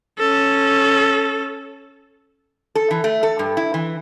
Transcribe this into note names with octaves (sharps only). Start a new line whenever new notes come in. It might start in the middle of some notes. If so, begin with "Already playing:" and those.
C#4 A4
A4
E3
A3
A4
G2
E4
E3